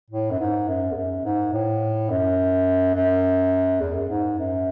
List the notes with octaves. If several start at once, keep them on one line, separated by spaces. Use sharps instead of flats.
A2
F#2
G#2
F#2
E2
F#2
G#2
A2
F#2
F#2
E2
F#2
G#2
F#2